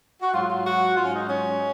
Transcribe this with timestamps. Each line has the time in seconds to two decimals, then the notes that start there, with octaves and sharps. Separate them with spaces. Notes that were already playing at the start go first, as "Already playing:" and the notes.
0.20 F#4
0.31 G#2 F#3 F4
0.48 F4
0.64 F#4
0.96 G#2 F#3 F4
1.04 C#4
1.12 D#4
1.28 C#4